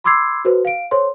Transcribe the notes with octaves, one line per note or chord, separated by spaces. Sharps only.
B5 C6 D6 E6 G#6 C7
F#4 A4 B4 C5
F5 D7
A4 C5 C#5 C6